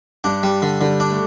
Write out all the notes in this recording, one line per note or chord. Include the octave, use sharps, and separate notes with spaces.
G2 D4
G3
D3
D3 G3
D4
A3